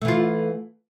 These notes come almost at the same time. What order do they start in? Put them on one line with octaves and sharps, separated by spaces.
A3 E3 F4